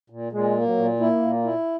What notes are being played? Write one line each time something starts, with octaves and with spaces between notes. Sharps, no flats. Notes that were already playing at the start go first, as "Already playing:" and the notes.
A#2
A#2 G#3
A#3
F#3
A#2
A#3 E4
A#2
E4